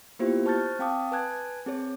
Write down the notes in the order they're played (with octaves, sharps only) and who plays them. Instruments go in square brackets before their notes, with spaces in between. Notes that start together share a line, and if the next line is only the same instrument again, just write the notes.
[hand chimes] A#3 B3 E4 F4 G4 C5
C5 A5 C#6 F6 G6 A6
C4 F5 G5 A5 D6 D#6
B4 G#5 A5 F#6 G#6
C4 G#4 C#5